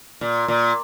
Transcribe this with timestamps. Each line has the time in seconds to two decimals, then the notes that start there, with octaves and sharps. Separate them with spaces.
0.21 A#2
0.48 A#2